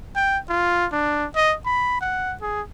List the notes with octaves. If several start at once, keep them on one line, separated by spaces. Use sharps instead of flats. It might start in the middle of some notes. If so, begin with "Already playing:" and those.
G5
F4
D4
D#5
B5
F#5
G#4